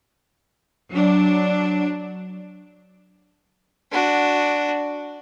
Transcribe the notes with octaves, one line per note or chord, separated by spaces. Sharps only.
F#3 D4
D4 F#4